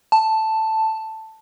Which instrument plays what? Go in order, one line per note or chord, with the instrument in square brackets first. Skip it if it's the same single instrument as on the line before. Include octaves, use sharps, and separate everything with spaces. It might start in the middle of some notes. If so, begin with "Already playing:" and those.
[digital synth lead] A5